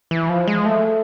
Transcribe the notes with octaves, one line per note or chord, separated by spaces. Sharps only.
E3
F3
G#3
A3